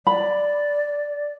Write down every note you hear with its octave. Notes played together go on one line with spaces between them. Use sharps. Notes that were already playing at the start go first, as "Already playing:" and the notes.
D5 B5